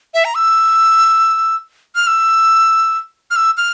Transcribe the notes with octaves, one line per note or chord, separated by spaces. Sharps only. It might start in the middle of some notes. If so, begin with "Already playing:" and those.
E5
A#5
E6
F6
E6
F6
E6
F6